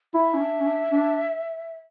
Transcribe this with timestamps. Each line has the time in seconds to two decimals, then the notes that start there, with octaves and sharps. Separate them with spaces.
0.14 E4 E5
0.34 C#4
0.40 D4
0.60 C#4
0.66 D4
0.91 D4